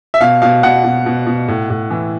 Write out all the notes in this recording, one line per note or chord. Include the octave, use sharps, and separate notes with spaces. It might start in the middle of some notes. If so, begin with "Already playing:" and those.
E5
B2 F5
B2 F5
B2 F#5
B2
B2
B2
A2
A2
E3